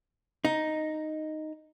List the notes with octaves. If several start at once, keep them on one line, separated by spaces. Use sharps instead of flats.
D#4